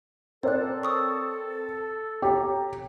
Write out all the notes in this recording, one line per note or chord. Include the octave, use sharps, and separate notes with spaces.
C4 A4 A#4 C#5 D5 F#6
C#6 D#6 E6
G4 C#5 A#5